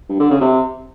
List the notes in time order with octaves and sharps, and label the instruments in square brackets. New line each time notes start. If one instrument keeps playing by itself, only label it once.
[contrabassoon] G2
D3
C#3
C3